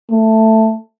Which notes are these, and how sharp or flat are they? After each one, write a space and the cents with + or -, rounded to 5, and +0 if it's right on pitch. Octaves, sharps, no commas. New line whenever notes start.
A3 +10